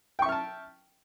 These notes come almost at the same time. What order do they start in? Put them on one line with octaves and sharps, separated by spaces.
G5 C#6 E5 F6 A5